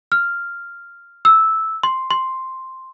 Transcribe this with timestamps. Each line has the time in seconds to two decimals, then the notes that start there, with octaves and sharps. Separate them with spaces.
0.12 F6
1.25 E6
1.83 C6
2.11 C6